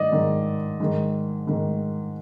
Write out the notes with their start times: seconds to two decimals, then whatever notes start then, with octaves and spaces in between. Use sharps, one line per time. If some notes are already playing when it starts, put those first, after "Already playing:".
Already playing: G#2 D#3 D5 D#5
0.12 G#2 D#3
0.80 G#2 D#3
1.47 G#2 D#3